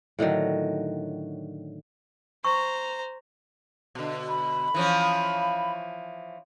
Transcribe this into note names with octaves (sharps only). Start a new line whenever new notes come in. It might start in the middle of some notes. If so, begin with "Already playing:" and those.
A2 D3 D#3 F#3
C5 A#5 C#6
B2 D3
B5
E3 F3 C#4